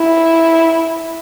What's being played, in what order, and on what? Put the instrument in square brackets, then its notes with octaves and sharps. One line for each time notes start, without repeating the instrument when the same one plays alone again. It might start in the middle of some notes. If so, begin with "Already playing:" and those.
Already playing: [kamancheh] E4